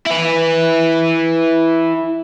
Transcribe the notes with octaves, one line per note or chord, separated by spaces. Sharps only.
E4 B4